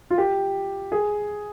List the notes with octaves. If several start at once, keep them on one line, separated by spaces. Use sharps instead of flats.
F4
G4
G#4